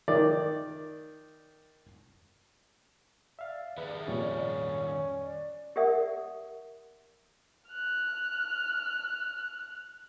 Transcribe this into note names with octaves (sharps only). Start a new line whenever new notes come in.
D#3 D5
D5 E5 F5
D#3 G#4 B4 E5
F2 A#2 G3 C#4
D5
G4 A#4 D5 E5 F#5 D#6
F6 F#6